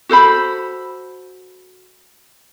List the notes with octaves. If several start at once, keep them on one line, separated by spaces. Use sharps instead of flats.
F#4 A4 C5 B5